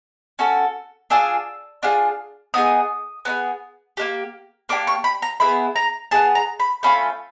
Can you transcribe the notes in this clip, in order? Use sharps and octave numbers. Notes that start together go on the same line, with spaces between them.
C#4 F#4 A4
D4 F4 G#4 E6
D4 F4 G#4
B3 D#4 G#4 D#6
B3 D#4 G#4
A#3 D4 G4
A#3 D4 G4 D6
C#6
B5
A#5
B3 E4 G#4 B5
A#5
B3 E4 G#4 A5
A#5
B5
A3 C#4 F4 B5